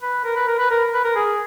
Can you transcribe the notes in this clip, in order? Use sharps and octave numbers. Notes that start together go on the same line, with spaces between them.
B4
A#4
B4
A#4
B4
A#4
B4
A#4
G#4